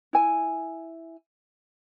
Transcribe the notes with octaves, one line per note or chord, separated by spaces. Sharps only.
E4 G#5